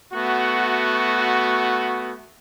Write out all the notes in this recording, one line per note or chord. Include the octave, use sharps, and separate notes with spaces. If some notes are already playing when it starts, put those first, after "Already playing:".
A3 B3 F#4